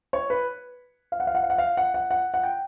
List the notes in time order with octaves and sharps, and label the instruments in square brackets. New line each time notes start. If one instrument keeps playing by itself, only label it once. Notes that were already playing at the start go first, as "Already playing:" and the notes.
[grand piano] C#5
B4
F5
F#5
F5
F#5
F5
F#5
F5
F#5
F#5
F#5
F#5
G5